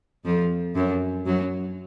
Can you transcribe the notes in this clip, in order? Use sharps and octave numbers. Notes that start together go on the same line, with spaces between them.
F2 F3
F#2 F#3
F#2 F#3